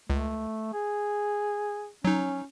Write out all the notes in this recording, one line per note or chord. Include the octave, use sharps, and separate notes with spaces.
C#2 A3
G#4
F#3 C#4 D#4